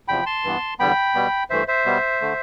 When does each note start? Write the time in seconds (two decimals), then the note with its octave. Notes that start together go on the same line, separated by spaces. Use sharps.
0.08 E2 C3 F3 G5 B5
0.26 A5 C6
0.44 G2 E3 B3
0.79 E2 D3 G3 B3 G5 B5
1.15 B2 G3 B3
1.50 G2 E3 A3 C5 E5
1.68 C5 E5
1.86 B2 G3 B3
2.21 D3 A3